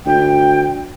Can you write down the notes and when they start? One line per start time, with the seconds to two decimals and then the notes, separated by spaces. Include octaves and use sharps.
0.06 D2 G5